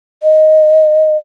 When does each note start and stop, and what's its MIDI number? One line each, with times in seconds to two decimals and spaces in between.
0.23 1.17 75